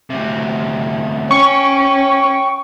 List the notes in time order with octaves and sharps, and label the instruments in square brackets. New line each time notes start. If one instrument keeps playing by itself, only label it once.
[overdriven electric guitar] D2 C3
[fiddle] C#4 [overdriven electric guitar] G5 [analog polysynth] C#6